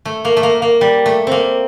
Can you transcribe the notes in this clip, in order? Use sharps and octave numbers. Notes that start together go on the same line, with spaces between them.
A3
A#3
A3
A#3
A#3
G3
A3
A#3 C4